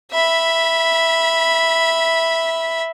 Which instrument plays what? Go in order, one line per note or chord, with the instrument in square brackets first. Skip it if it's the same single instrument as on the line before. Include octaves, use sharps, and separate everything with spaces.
[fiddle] E5 B5